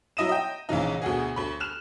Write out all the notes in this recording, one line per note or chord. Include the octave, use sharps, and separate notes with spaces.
F#3 E4 D#5 D#6 D#7 E7
D#5 G5
A#1 C#3 E3 D#4
D2 B2 F#4 G#4
D2 B5
F6 F#6 E7 F7